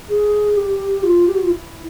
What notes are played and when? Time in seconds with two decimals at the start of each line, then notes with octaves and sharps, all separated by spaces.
0.10 G#4
0.57 G4
1.03 F4
1.27 G4
1.35 F#4
1.43 F4
1.50 E4